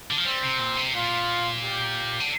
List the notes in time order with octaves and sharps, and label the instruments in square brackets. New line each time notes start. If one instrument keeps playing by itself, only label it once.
[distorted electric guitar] D3
F3
[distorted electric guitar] G3 [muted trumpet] C4
[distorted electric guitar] C3
A#2
C3
[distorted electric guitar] A#2 [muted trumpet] F4
[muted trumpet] G4
[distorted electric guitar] D3